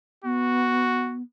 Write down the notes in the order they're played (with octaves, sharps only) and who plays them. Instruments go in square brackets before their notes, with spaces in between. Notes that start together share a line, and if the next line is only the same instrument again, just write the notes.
[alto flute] B3 [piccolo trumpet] F#4